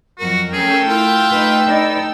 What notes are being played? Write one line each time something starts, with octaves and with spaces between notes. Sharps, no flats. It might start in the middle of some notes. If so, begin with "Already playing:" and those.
F2 F#3 F#4 A#4
A3 C#4 G#4 A4 G5 E6
E4 F4
D#4 B4
D#4 A4 B4 D5 D#5